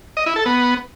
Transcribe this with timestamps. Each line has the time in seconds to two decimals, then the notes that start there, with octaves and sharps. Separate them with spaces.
0.17 D#5
0.26 E4
0.36 A4
0.46 B3